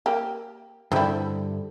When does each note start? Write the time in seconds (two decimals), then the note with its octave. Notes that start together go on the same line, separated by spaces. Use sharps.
0.06 A#3 G4
0.92 G2 D3 G3 C4 E4